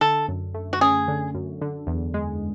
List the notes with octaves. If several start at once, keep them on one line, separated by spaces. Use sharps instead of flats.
D3 A4
F#2
A3
F#4
C#4 G#4
D3
F#2
D3
E2
G#3